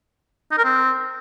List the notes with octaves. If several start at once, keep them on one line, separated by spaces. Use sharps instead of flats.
D#4
A#4
C4